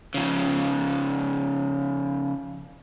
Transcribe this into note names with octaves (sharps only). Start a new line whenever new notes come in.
C#3 F3